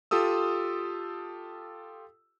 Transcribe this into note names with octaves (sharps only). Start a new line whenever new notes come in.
F4 G4 A4 D#6 E6